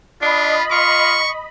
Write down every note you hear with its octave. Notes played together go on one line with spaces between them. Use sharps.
D4 F4 D#5 B5
F4 C#6